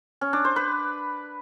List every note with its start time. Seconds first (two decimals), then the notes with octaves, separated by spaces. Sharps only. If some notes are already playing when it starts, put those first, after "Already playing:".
0.21 C#4
0.33 D4
0.45 C5
0.56 B4